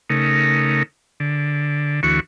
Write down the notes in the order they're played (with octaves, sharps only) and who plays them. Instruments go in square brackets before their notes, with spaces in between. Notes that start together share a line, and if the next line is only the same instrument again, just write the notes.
[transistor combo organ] C#3 A3 D#4 A#4
D3
D2 E3 F#4 C#6